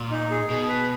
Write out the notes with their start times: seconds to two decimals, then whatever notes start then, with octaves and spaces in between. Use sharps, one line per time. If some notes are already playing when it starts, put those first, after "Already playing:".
Already playing: A#2
0.11 D#4
0.31 G#4
0.50 B2 G#4
0.68 B4